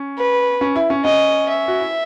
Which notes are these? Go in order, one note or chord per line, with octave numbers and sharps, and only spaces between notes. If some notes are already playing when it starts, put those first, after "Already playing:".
Already playing: C#4
B4
C#4
E4
C#4
C#4 D#5
E5
F#4
E4